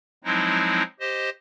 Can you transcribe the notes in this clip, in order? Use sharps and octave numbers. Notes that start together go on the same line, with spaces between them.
F3 F#3 G#3 C4 D#4 E4
G4 C5 D#5